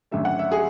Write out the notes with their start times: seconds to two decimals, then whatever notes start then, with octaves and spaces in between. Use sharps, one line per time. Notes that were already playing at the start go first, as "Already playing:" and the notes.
0.11 G#1 F#2 D3 A3 E5
0.25 F#5
0.39 E5
0.52 G#4